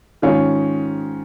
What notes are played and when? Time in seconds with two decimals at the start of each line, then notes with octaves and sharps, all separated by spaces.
0.22 G#2 D#3 C#4 F4